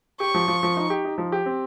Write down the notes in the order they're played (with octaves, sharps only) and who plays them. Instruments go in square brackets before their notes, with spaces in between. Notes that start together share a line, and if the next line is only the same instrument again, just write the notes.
[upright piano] G4 [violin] C#6
[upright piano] F3
F3
F3
D#4
G4
D#4
F3
G4
C4